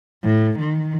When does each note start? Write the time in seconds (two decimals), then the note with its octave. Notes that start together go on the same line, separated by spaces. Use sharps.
0.24 A2
0.59 D#3